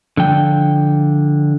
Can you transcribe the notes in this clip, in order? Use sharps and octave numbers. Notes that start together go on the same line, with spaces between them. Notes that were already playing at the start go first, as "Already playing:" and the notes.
D3 F3 G5